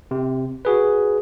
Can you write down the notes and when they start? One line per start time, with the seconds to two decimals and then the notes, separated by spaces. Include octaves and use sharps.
0.11 C3
0.65 F#4 G#4 B4